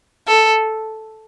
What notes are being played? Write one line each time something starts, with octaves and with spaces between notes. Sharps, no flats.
A4